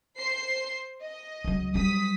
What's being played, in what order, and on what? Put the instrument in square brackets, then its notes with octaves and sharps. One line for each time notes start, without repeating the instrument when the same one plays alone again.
[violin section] C5 C6 C7
D#5
[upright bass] C#2 F#3
[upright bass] F#3 G3 [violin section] D#6 B6